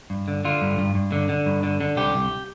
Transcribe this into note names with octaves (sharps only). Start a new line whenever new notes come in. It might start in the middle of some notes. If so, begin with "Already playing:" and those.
G2
D3
D3 F4
G2
G2
G2
D3
D3
G2
D3
D3
C2 G4
C2